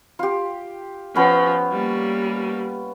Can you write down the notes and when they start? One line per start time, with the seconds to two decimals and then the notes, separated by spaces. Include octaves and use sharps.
0.19 F4 G4
1.16 F3 B3 C#4
1.72 G3 A#3